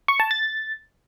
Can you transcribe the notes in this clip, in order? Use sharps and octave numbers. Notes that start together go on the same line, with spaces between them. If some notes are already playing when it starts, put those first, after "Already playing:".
C#6
A5
A6